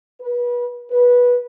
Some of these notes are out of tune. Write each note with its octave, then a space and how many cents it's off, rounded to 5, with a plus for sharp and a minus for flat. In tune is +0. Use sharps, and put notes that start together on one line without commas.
B4 -30
B4 -15